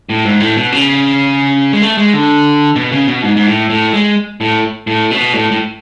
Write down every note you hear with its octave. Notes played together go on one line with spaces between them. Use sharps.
A2
G#2
A2
B2
C#3
G#3
A3
G#3
D3
B2
C#3
B2
G#2
G#2
A2
A2
G#3
A2
A2
B2
A2
A2